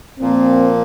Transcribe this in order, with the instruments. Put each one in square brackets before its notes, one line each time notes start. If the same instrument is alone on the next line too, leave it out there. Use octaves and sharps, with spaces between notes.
[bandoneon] A#2 F3 A#3 [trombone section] C4